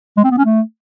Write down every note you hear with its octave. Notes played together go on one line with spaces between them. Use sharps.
G#3
C4
B3
C#4
A3